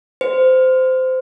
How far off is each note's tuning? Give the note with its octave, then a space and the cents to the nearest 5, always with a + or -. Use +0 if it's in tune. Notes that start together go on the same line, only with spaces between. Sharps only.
C5 -20